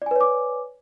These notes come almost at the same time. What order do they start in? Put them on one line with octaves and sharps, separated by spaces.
D5 G#5 B4 C#5 D6